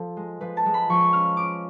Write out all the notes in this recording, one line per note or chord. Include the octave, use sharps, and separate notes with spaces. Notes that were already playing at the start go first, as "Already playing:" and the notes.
Already playing: F3 A4
G#3
F3 B4
A5
G#3
B5
F3 C#6
C#4 F6
C#4 D6